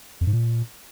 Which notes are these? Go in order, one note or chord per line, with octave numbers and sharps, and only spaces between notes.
F2
G#2
A#2